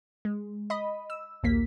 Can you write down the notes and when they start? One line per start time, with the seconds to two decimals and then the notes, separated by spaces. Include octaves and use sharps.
0.25 G#3
0.70 D#5 B5
1.10 E6
1.43 A#1 D#2 A#3 B6